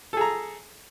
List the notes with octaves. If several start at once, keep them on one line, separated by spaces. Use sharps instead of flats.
G#4 A4 A#5